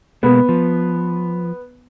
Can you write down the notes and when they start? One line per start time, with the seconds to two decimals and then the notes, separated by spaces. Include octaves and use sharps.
0.23 B2 G#3 A#3 B3
0.49 F3